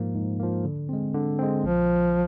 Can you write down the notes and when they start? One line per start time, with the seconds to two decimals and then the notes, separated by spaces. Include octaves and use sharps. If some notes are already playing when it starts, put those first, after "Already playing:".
Already playing: G#2 F3 A#3
0.15 G#2
0.40 F3 A#3
0.64 D3
0.89 G#3 C4
1.14 D3
1.39 G#3 C4
1.64 A#1 F3